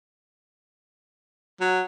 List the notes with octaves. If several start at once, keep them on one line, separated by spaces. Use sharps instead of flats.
F#3